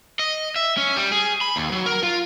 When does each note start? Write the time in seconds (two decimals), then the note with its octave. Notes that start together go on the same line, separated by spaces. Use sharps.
0.19 D#5
0.56 E5
0.77 C#4
0.96 G3
1.12 G#4
1.41 B5
1.56 D#2
1.72 F#3
1.86 A#4
2.03 F4